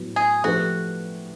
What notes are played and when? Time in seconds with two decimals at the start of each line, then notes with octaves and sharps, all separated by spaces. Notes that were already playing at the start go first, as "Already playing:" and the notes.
Already playing: A2 F#3 B3
0.16 G#4
0.44 F3 A3 D4 F#4 G4 B4